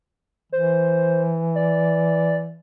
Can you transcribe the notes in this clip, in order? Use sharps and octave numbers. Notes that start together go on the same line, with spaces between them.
E3 C5
D5